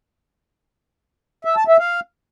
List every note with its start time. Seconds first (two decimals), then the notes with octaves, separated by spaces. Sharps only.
1.45 E5
1.56 A5
1.68 E5
1.79 F5